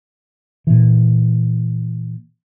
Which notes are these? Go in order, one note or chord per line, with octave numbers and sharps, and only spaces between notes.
A#2 E3